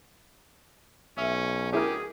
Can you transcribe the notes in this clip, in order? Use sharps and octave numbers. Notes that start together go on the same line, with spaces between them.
B1 C#4 E5
D2 C#4 E4 G4 G#4 A#4